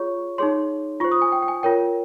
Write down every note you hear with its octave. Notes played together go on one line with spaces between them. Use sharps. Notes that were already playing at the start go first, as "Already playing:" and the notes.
Already playing: F4 G#4 C#5 C#6
D#4 G#4 C#5 C6
F4 C5 C#6
D#6
G#5
G5
G5
G#5
F4 A#4 C#5 G5